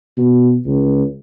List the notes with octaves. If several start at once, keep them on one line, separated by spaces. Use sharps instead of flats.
B2
C#2